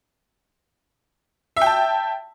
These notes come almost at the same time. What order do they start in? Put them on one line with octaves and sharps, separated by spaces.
E5 G5 A5